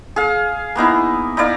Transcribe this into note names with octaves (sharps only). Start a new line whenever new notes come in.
G#4 F5
A#3 B3 D#4 E4
D#4 E4 D5 F5